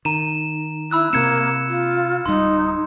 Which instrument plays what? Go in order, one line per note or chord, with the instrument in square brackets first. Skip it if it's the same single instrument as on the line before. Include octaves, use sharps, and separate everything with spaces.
[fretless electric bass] D#3 [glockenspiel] A#5 D#7 E7
[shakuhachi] E4 [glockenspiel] B5 E6 F#6
[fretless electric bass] C3 C4 [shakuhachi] A#3 [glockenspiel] G#6 C#7 E7
[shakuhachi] F4
[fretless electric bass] D1 G3 [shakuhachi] D#4 [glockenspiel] C6